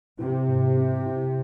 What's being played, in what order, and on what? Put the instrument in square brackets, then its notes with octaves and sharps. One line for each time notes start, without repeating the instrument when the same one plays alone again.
[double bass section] C3 [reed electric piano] E4
[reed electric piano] G#2
C4
E4